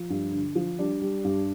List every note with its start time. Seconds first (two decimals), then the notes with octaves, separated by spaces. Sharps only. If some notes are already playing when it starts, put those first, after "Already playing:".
Already playing: F3
0.10 G2
0.32 D3
0.55 F3
0.79 G3 D4
1.02 G3
1.24 G2